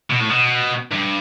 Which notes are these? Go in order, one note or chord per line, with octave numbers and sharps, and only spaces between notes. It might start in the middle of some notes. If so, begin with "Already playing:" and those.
B2
A2
B2
G2